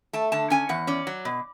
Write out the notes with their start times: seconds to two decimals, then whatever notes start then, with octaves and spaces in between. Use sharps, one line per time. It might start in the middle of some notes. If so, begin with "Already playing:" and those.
0.13 A3 A5
0.32 D3 A5
0.50 C#4 G#5
0.69 E2 F#5
0.87 C#4 D5
1.07 F#3
1.25 B2